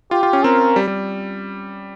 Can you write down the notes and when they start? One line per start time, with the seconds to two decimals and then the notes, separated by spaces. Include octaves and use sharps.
0.11 F4 G4
0.23 F4
0.33 C#4
0.44 C4 A#4
0.76 G3
0.87 G3